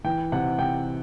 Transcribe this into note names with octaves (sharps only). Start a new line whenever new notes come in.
E3 G5
C3 F#5
C3 G5